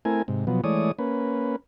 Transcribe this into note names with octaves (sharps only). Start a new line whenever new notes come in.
A3 C4 E4 A#4 G#5
G#2 C3
B2 F3 F#3 B3
E3 G#3 A3 C#5 D5 D#6
A#3 C#4 B4